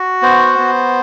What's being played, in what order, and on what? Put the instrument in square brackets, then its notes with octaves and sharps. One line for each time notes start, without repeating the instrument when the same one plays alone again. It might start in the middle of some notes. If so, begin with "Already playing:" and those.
Already playing: [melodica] F#4
B3 C5
B3